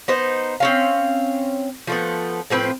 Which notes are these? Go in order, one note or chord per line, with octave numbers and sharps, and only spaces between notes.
B3 D#4 C5
C4 C#4 F5
F3 A3 B3
A2 F3 C4 B4